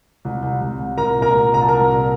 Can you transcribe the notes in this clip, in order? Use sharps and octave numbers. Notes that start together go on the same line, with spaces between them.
C2
C2
C2
C2
C2 A#4 A#5
A#2
A#4 A#5
C2
C2 A#5
A5
C2 A#4 A#5
A#2